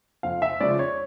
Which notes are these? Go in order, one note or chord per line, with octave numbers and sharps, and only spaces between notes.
F2 F5
E5
C#3 F3 G#3 C#4 D5
C#5